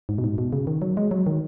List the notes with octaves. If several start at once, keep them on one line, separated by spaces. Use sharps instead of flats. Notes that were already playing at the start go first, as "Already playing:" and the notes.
G#2
B2
G#2
B2
C#3
D#3
F#3
G#3
F#3
D#3